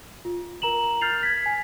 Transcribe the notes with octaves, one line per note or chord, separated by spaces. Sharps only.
F4
A#4 A#5 E7 F#7
F6 G6 A6 C7 F7
G#6 B6
G#5